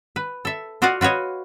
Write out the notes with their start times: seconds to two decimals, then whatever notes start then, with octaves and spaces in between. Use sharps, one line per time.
0.16 B4
0.45 A4 E5
0.82 F4 F#4 D5 D#5 F5 F#5
1.01 F4 F#4 B4 C#5 D#5